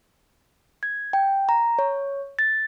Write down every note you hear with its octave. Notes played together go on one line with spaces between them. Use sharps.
G#6
G5
A#5
C#5
A6